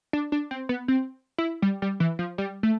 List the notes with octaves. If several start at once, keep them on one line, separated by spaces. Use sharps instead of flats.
D4
D4
C4
B3
C4
E4
G3
G3
E3
F3
G3
A3